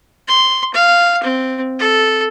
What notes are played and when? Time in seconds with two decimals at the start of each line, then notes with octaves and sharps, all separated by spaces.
0.28 C6
0.74 F5
1.23 C4
1.79 A4